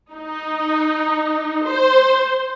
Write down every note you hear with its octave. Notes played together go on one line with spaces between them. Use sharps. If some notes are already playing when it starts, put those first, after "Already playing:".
D#4
C5